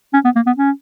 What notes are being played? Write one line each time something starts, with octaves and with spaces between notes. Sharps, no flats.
C#4
B3
A#3
B3
C#4